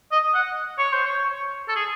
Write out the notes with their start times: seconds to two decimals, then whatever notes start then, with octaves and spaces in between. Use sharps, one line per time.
0.12 D#5
0.34 F#5
0.78 C#5
0.93 C5
1.06 C#5
1.68 A4
1.76 G#4